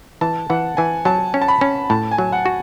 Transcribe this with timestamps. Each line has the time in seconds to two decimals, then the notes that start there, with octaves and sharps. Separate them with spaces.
0.21 E3 A5
0.50 E3 F#5
0.77 E3 G#5
1.05 F#3 A5
1.34 C#4
1.42 A5
1.48 B5
1.61 C#4
1.90 A2 A5
2.11 G#5
2.18 F#3
2.33 F#5
2.46 F#4